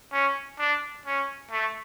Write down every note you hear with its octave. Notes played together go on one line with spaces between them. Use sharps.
C#4
D4
C#4
A3